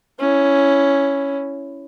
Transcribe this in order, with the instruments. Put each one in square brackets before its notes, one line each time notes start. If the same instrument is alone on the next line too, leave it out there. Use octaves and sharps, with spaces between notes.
[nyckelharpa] C#4 E4